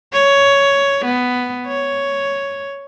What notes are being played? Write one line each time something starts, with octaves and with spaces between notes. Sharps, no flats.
C#5
B3
C#5